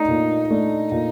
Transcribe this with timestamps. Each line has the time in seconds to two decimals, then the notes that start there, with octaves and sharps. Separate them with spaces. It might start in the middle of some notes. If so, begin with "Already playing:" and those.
Already playing: A3 D4 D#4
0.08 A#2
0.50 A3 D4
0.92 A#2